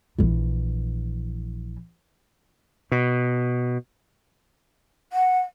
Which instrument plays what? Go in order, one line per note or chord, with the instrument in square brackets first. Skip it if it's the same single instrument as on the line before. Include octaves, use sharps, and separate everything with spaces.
[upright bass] A#1 E3
[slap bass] B2
[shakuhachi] F#5